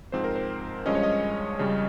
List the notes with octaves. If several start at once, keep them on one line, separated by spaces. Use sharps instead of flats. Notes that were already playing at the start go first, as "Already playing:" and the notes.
G#2 F3 C4 C5
A#4
C5
G2 F3 G#3 C#4 D#5
C#5
D#5
F2 C#3 G3 C#4